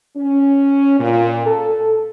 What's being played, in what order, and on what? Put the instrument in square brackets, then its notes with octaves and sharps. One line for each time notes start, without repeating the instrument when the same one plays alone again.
[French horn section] C#4
A#2
A4